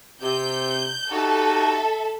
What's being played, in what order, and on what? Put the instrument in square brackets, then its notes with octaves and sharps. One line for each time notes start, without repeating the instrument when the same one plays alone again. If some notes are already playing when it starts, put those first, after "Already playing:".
[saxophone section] C3 [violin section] G6
[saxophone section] D#4 F#4 G4 [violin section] A4 E5